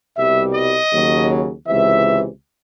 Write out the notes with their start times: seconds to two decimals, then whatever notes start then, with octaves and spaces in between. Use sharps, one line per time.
0.17 C2 B2 G3 E5
0.55 D#5
0.93 D#2 C#3 F#3
1.68 C#2 C3 E3 E5